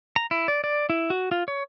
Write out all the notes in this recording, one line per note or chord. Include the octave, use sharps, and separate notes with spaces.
A#5
E4
D5
D5
E4
F#4
F4
C#5